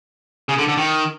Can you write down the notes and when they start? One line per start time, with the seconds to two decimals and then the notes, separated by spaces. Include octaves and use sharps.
0.49 C#3
0.58 D3
0.68 D3
0.77 D#3